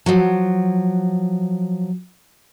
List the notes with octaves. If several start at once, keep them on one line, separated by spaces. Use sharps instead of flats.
F3 F#3